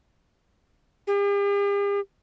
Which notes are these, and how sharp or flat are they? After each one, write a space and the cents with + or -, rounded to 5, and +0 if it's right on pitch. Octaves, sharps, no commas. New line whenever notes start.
G4 +45